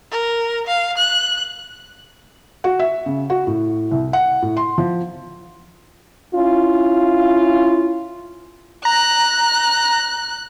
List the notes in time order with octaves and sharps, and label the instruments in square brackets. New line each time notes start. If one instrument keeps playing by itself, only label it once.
[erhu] A#4
F5
F#6
[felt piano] F#4
E5
C#3
F#4
A2
C2
F#5
A2
C6
F3
[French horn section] C#4 E4 F4
[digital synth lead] A#5 [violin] F#6